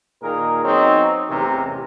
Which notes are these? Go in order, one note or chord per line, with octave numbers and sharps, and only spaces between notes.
A#2 D#3 G#4 A#4
F#3 B3 C4 D#4
A1 E2 C3 E3 A#4